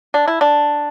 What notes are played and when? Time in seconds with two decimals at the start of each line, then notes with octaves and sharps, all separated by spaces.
0.14 D4
0.27 E4
0.41 D4